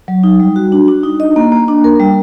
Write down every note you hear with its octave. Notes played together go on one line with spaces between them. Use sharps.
F#3
D#4
G3
F#4
D4
D4
D#4
D#5
A#3
A#3
D4
A#4
G3